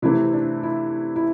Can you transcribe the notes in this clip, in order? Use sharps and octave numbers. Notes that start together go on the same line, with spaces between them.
C3 E3 A3 C4 E4
D4
E4
E4